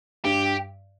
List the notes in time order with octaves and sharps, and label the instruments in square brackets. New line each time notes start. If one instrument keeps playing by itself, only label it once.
[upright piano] G2 [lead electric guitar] G4